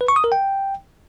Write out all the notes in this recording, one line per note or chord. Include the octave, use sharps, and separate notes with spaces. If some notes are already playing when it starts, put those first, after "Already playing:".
B4
C#6
D#6
A#4
G5